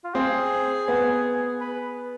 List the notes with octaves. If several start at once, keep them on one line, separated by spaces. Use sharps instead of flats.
F4
C4 G#4
B3
B4